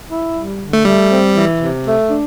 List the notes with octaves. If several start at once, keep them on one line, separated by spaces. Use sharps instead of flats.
E4
G3
D3
A3
G3 A3
C4
E3
C3
A3
D4